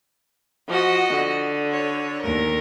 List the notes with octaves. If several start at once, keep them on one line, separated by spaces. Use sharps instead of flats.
F3 F#4 D#5 F#5
D3
C#5
D#2 A#4